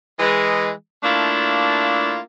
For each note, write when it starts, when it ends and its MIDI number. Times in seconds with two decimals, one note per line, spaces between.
0.20 0.70 52
0.20 0.70 56
1.04 2.19 57
1.04 2.19 58
1.04 2.19 62
1.04 2.19 64
1.04 2.19 65